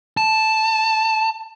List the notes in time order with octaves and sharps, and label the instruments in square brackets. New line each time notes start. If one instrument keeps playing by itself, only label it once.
[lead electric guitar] A5